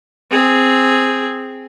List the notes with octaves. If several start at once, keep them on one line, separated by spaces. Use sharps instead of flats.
C4 G#4